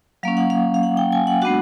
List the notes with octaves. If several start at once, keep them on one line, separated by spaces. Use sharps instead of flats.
F#3 A#3 C#4 F5
F#5
F5
F5
F#5
G5
G#5
F#5
G#3 B3 D4 F#4 F#5